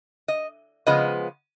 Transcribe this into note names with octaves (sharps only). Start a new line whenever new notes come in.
D#5
C#3 F3 G#3 B3 D#5